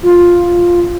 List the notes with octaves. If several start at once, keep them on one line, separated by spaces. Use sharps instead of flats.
F4